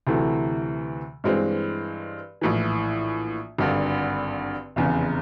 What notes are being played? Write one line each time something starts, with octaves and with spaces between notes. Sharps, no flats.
D2 C3 E3 A3
G2 E3 G#3 C4
A#1 A2 E3
G#1 G2 D3
F1 E2 C#3